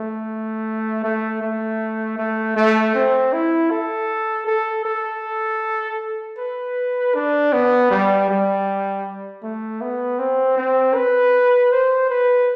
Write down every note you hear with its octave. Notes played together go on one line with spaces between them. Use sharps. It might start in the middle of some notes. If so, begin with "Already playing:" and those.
Already playing: A3
A3
A3
A3
A3
C4
E4
A4
A4
A4
B4
D4
B3
G3
G3
A3
B3
C4
C4
B4
C5
B4